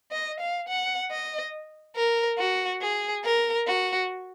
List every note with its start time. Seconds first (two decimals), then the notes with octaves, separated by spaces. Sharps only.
0.11 D#5
0.40 F5
0.69 F#5
1.11 D#5
1.96 A#4
2.39 F#4
2.82 G#4
3.24 A#4
3.66 F#4